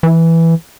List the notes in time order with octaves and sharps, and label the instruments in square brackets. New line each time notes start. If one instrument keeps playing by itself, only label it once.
[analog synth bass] E3